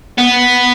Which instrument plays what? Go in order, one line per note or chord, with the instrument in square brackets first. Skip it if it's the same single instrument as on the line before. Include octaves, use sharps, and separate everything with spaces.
[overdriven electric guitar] B3